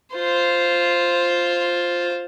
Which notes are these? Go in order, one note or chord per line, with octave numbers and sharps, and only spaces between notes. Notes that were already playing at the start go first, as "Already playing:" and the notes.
F4 C5